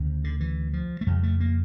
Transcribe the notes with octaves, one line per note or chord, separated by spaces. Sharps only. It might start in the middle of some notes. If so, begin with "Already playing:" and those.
Already playing: D2 C#3
D3
E3
F3
A3
F2 C#3 G3
A3
A#3